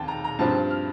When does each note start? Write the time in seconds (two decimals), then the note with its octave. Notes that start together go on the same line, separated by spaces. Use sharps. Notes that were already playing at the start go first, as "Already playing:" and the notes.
Already playing: F1 D#2 G5 A5
0.08 A#5
0.24 A#5
0.39 G2 F3 C4 A5
0.71 F6